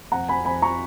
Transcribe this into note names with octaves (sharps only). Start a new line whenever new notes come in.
F2 F#5 A#5
F2 G#5 B5
F2 G#5 B5
F3 A#5 C#6